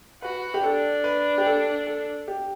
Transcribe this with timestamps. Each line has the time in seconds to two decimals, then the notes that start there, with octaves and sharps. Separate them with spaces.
0.22 F#4 B4
0.54 G4
0.63 D4 A4
1.04 B4
1.38 G4
1.46 A4
1.87 A4
2.28 G4